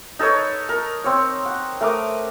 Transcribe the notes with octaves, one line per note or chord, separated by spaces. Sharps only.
D#4 A4 B4 C#5
A#4
C4 C#5
F#5
A3 A#4 D6 D#6